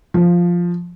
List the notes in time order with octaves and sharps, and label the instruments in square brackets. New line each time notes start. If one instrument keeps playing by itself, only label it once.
[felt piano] F3